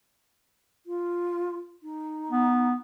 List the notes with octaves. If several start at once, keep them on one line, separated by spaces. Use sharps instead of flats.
F4
D#4
B3